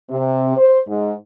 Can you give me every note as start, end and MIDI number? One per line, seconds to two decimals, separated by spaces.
0.10 0.55 48
0.57 0.81 72
0.88 1.13 44